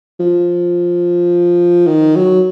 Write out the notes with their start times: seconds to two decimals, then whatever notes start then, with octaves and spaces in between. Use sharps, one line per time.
0.20 F3
1.87 D#3
2.15 F#3